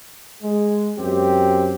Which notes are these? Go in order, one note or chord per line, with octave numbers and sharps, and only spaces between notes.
G#3
F#2 C4 G4